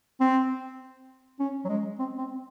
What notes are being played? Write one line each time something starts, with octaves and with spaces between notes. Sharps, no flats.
C4
C#4
F#3
G#3
C4
C4